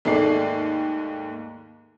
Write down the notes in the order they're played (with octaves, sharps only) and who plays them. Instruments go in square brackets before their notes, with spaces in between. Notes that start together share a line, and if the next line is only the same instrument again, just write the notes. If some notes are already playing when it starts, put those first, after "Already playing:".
[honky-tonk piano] D#2 G#2 A3 D5 C7